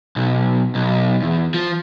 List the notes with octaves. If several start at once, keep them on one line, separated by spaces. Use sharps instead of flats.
B1
B1
E2
F3